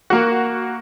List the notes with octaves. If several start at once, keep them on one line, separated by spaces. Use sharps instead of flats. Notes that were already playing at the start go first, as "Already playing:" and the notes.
A#3 F#4